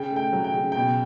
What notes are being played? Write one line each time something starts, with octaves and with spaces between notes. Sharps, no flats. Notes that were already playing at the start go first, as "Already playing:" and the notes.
Already playing: C#3 G5
A3
G5
F#3
G5
C#3
B2 G5